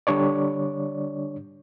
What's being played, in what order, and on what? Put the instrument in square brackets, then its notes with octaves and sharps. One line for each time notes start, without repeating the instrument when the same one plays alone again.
[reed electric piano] D3 G3 D4 C#5 D5